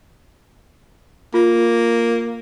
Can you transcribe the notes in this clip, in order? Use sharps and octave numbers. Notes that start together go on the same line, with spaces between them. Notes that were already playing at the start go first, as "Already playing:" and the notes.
A#3 F4